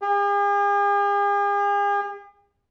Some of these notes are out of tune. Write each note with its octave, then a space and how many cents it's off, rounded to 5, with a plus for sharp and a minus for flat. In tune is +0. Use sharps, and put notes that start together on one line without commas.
G#4 -45